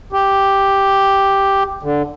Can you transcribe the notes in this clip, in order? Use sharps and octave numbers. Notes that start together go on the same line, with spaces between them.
G4
D3